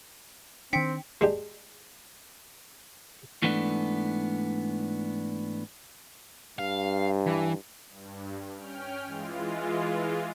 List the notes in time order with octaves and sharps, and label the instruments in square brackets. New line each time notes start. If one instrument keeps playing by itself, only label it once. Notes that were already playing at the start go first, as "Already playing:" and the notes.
[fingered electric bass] D#3 D4 [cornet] C4 [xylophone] G5 B6 C#7
[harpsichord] G#3 D4 G4
[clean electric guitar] G#2 E3 A3 B3 C#4 D4
[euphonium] G2 [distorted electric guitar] F5
[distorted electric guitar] E3
[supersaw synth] G2
C#4 G5 F6
E3 G#3 F4